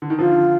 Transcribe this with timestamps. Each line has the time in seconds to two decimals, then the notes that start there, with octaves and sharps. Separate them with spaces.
0.02 D3
0.10 D#3
0.19 D3 F3 F4